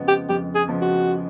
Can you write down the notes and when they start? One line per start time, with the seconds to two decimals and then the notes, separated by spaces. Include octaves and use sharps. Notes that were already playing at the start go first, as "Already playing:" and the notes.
Already playing: F2 C#3 F3 G#3 B3
0.08 G4
0.29 F2 G4
0.55 G#4
0.68 C#3 F3 G#3 B3
0.81 F#4